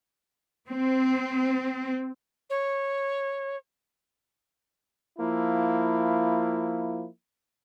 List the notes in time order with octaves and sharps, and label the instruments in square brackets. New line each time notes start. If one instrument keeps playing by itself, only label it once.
[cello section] C4
[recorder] C#5
[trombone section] F3 A#3 E4